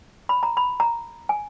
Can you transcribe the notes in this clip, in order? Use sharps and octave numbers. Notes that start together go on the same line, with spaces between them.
B5
A#5
B5
A#5
G#5